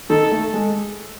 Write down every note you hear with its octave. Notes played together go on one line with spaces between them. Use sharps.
D#3 D#4 A4
A3 A4
G#3 G#4